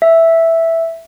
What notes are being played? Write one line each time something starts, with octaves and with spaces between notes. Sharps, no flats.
E5